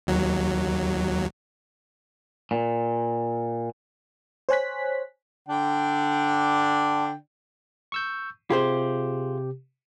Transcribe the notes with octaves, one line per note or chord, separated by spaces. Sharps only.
D#2 F#3
A#2
C5 C#5 G#5 F#6 B6
D3 D4 G5
C#6 E6 G6
C3 F4 G4 G#4 C5